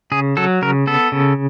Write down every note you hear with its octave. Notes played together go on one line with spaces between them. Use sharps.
C#3 G#4
F#3 A4
C#3 A#4
B3 A4
C#3